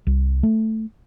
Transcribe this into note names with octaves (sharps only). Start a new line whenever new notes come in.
C2
A3